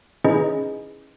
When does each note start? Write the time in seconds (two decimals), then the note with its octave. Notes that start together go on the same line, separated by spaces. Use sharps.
0.24 C#4 D#4 E4 G#4 B4 D#5